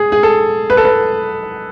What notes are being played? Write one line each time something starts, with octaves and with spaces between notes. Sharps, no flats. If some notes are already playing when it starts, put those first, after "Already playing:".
Already playing: G#4
G#4
A4
B4
A4
B4